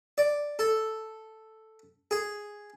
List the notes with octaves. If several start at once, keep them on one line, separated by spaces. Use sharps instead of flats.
D5
A4
G#4